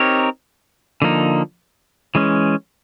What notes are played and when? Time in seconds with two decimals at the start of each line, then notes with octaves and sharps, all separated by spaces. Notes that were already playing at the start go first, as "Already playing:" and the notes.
Already playing: C4 D#4 G4 A#4 C#5
1.02 D3 F3 A#3 D#4
2.15 E3 G#3 C#4